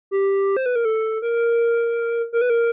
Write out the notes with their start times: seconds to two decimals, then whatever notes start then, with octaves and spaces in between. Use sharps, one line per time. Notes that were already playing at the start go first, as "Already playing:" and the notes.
0.11 G4
0.57 C5
0.66 B4
0.76 A#4
0.85 A4
1.22 A#4
2.33 A#4
2.41 B4
2.50 A#4